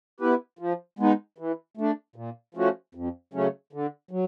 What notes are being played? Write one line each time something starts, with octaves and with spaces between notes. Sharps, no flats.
B3 E4 G4 B4
F3
G#3 B3 D#4
E3
A3 D4
A#2
F3 A3 C#4 F#4
F2
C#3 F#3 A3 C#4
D3
F#3